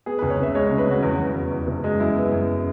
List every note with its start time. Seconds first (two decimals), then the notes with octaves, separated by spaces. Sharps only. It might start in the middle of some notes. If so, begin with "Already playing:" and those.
0.06 B3 G#4
0.19 C#2 B4
0.30 C#5
0.38 C#3 E5
0.55 G#3 C#5
0.66 C#3 C#5
0.78 B4
0.87 C#3 F#4
1.03 E2 F#4
1.19 E2
1.35 E2
1.51 E2
1.67 F#1
1.84 G#3
1.99 F#2 E4
2.16 B3
2.32 F#2